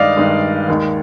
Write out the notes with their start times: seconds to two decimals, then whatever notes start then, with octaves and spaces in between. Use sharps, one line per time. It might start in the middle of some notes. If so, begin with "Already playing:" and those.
Already playing: G2 D#3 G#3 D5 D#5 F5
0.17 G2 D#3 G#3
0.68 D#2 D#3 G#3